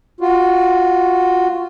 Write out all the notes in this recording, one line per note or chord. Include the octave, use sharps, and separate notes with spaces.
F4 F#4